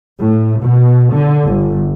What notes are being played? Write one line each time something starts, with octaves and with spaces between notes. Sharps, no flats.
A2
B2
D3
G1